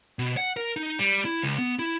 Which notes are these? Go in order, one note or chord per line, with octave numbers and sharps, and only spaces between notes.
B2
F#5
A#4
D#4
G3
E4
C#2
B3
E4